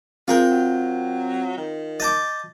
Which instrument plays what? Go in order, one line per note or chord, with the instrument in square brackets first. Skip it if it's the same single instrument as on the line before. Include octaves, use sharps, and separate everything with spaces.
[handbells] C4 G6 [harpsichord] F4 A#4 G5 [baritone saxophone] G#4
[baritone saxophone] F#3
D#3
[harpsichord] D#5 A5 D6 [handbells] G6 A6